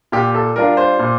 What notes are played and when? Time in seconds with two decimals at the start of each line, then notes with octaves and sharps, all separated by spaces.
0.12 A#2 G4
0.34 A4
0.56 G3 D4 F4 A#4
0.77 C5
0.99 A#2